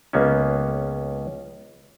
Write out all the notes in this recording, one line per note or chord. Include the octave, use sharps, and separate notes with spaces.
C#2 A#3 B3 C#4